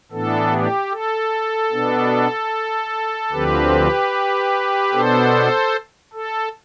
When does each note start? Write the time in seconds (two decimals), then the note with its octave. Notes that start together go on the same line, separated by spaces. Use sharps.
0.12 A2 E3 B3 D4 A4
0.51 G4
0.91 A4
1.72 B2 B3 D4
3.32 D2 D3 F3 C4 G4 B4
4.92 B2 B3 D4 A4 C5
6.13 A4